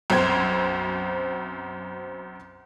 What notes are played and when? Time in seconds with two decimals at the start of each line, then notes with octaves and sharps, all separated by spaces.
0.10 B1 F#2 C4 C5 G#6